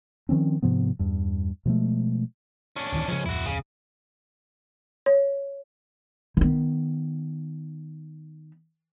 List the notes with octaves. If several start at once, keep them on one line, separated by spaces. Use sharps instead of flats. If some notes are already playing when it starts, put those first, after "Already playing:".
D#3 F3 C4 C#4
G#2 C3 F3 B3
E2 G2
B2 F3 G#3 A3
C#4 D4
D1 D#3 E3
G#2 C#3 F3 C#4
D1 F2 E4 F#4
C#3
C#5
D#3 B3